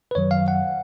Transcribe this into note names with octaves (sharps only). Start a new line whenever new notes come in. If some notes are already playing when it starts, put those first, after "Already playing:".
B4
F#2 D#3 F#3 C#5
F5
F#5